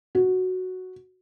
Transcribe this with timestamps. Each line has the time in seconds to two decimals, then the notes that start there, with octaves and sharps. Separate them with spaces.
0.15 F#4